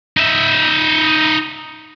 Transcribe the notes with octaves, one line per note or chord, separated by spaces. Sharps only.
D#4 E5